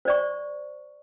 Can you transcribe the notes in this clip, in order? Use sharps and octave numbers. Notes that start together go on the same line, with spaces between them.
C5 D5 C#6